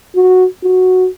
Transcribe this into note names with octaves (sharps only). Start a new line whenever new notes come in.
F#4
F#4